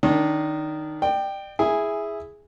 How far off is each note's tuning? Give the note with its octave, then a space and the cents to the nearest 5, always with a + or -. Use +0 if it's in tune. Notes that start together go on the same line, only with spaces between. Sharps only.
D#3 -10 D4 -30
D5 +40 G5 +0
E4 +0 G#4 +0 G#5 -10